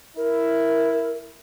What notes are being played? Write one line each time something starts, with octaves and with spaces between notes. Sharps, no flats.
E4 A#4